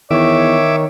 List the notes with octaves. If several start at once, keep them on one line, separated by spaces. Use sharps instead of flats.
E2 D#3 C#5 E5 D6